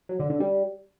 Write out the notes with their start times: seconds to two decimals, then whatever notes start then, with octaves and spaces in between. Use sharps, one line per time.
0.09 F#3
0.19 D3
0.30 D3
0.40 G3